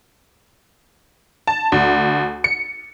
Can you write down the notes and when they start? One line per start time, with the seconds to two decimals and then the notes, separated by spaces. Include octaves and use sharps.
1.47 A5
1.72 D2
2.44 C#7